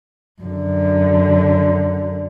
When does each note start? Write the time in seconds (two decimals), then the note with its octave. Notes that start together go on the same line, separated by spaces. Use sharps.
0.42 F#2 D3